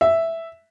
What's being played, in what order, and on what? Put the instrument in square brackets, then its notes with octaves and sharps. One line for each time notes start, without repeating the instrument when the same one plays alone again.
[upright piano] E5